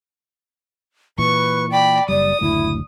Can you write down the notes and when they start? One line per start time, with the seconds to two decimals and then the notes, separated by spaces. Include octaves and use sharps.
1.18 A#2 E3 B4 C#6
1.71 D5 G5 B5
2.09 F#1 G3 D5 D#6
2.41 F#1 D2 A2 E4